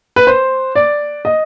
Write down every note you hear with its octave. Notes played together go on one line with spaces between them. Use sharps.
B4
C5
D5
D#5